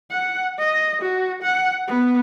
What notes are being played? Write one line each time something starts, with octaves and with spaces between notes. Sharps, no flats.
F#5
D#5
F#4
F#5
B3